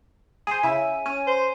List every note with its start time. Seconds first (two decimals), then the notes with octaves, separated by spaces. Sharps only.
0.47 G#4 C5 G#5 D#7
0.63 C#3 E4 E5
1.06 C#4 D#7
1.27 C5